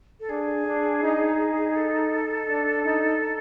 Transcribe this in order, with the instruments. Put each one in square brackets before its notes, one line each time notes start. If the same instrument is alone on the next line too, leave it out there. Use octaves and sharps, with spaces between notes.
[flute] A4
[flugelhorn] D4 [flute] G#4
[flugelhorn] D4
D#4
[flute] A4
[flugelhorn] D4
D#4